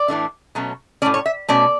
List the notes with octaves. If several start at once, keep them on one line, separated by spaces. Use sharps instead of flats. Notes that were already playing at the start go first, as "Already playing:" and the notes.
Already playing: D5
A2 E3 A3 D4
B2 F#3 A3 C#4
A2 F#3 A3 C#4 D5
C#5
E5
B2 A3 C#4 D5